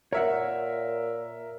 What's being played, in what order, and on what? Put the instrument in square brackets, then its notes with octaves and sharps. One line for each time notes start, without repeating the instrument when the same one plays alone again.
[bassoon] A#2 [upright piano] A#4 E5 [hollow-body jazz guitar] C#5 F#5